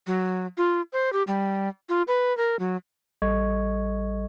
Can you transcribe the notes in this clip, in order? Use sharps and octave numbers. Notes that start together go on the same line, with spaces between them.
F#3
F4
C5
G4
G3
F4
B4
A#4
F#3
A1 G3 A4 D#5 C#6 G#6